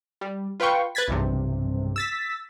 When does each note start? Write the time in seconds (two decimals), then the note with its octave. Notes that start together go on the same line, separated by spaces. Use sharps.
0.21 G3
0.60 F4 B4 F5 G5 C#6
0.95 B4 F#6 G#6 A6 B6
1.08 B1 E2 G2 C3
1.96 E6 A6 B6